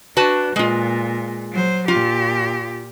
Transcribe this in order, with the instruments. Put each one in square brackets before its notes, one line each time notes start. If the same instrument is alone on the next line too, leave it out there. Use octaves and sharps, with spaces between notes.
[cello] D4 [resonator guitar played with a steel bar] F#4 B4 A5
[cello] A#2 [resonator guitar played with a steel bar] G#3 F4
[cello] F#3 C5
[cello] A#2 G4 [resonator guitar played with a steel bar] F4